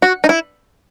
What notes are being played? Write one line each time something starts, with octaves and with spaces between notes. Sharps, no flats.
F#4
D#4
E4